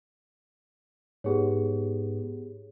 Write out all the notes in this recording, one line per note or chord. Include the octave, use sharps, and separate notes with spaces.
G#2 B3 G4 G#4 C#5